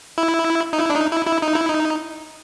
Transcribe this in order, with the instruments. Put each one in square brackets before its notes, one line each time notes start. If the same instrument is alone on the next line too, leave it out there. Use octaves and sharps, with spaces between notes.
[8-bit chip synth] E4
D#4
E4
D4
D#4
E4
E4
D#4
E4
D#4